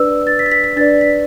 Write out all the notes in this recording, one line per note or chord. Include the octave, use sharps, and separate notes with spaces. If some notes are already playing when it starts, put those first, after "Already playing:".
Already playing: D4 B4 D5 E6
A6
B6
A6
B6
B6
D4 B4 D5 A6
B6